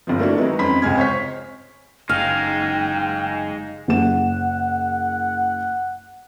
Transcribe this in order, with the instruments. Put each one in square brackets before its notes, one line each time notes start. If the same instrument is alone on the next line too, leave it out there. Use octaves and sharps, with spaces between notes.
[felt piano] G1 F3
A3 A#3 D4 E4 F#4
D#3 F#3 G#3 F#4 B4
F2 C#4 B5 C6 B6
C#2 C3 G#3 G#5 F6 G#6
C5 C#5 C#6 B6
[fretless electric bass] F#1 [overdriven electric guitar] G#3 D#4 [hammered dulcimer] F5 [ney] G5
[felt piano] F#1 E7 [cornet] F#5